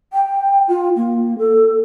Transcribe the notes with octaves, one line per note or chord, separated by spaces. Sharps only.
G5
F4
A#3
A4